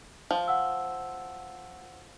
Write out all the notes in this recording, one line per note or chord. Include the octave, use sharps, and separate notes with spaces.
F3
F#5 E6